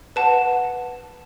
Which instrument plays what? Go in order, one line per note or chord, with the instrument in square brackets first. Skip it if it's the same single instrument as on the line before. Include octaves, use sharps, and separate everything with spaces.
[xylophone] B4 F#5 A5